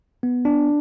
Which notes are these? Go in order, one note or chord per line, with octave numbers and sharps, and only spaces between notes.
B3
D4